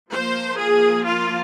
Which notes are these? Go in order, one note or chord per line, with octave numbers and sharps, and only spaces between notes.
F3 A#3 C5
G#4
F4